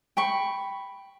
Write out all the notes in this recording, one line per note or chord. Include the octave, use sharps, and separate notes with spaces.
G5 B5 C#6